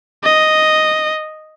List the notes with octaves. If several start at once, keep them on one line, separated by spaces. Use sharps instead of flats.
D#5